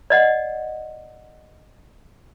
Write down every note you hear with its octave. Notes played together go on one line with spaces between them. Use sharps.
D5 D#5 F#5